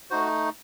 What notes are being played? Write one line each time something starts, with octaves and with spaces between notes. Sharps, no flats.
A3 D#4 F#4 C5